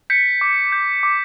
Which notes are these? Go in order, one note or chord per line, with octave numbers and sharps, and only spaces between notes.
G6 B6 C#7
D6
G6
D6